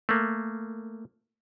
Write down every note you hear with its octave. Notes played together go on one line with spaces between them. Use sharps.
A3 A#3